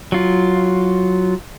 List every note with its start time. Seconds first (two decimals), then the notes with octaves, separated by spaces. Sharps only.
0.12 F#3 F4